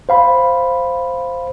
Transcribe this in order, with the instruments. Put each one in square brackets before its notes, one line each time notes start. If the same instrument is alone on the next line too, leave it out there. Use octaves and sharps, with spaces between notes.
[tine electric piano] C5 F5 B5